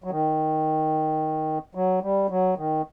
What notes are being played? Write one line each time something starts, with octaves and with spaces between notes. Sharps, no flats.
F#3
D#3
F#3
G3
F#3
D#3